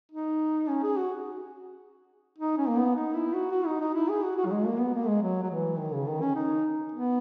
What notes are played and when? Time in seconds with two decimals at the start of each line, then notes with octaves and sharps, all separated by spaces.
0.12 D#4
0.68 C#4
0.83 G#4
0.97 F#4
2.38 D#4
2.58 C#4
2.68 A#3
2.77 B3
2.96 D#4
3.14 E4
3.33 F#4
3.51 F#4
3.66 D#4
3.80 D#4
3.94 E4
4.08 G#4
4.23 F#4
4.37 F#4
4.46 F#3
4.51 G#3
4.65 A#3
4.80 B3
4.94 A#3
5.07 G#3
5.22 F#3
5.42 F#3
5.50 E3
5.78 D#3
5.93 C#3
6.07 D#3
6.21 C#4
6.35 D#4
6.92 B3